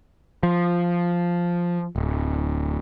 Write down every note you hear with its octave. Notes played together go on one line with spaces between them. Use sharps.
F3
D1